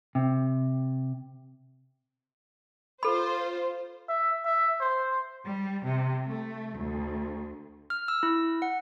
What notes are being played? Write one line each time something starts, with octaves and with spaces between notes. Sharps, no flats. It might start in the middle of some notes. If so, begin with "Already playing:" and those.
C3
F4 A4 C5 B5
E5
E5
C5
G3
C3
A3
D2
F6
E6
E4
F#5